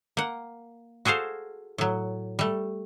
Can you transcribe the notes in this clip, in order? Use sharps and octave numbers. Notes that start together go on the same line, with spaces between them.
A#3 F#5
F#4 G#4 A4 C5 F5
A2 F#3
G3 A3